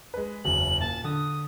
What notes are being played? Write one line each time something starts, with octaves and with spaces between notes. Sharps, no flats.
G#3 B4
F#1 E2 F#3 F#7
A#2 A5
D3 D#6